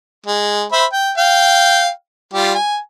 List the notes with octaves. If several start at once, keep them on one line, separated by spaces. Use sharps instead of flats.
G#3
C5 E5 B5
G5
F5 G5
G3 F4 G4
G#5